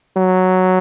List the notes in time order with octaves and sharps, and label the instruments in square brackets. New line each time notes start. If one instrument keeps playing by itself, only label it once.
[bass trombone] F#3